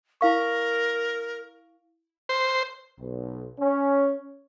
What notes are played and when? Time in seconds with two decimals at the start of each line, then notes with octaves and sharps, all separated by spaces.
0.21 E4 A#4 F5 C#6
2.29 C5
3.00 B1
3.60 C#4